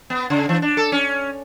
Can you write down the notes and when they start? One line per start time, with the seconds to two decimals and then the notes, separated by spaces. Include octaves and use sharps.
0.10 B3
0.30 C#3
0.49 E3
0.62 D4
0.77 A4
0.92 C#4